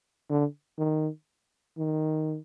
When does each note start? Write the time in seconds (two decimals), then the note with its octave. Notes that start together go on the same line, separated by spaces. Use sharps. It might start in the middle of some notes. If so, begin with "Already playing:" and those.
0.30 D3
0.78 D#3
1.78 D#3